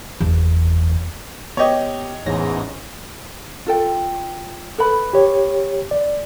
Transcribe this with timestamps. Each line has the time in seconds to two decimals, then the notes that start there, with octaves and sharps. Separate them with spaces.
0.21 F#1 E2
1.57 B2 G4 C#5 D#5
2.26 A1 E2 G#2 C#4 A#6
3.67 F4 A4 G5
4.78 A4 B4 B5
5.13 G4 C#5
5.91 D5